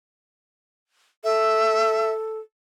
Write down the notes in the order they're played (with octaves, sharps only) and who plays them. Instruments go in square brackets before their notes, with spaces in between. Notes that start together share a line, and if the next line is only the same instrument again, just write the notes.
[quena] A4 [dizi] E5